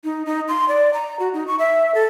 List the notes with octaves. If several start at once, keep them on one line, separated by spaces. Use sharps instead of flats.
D#4
D#4
C6
D5
A#5
F#4
D#4
C#6
E5
A4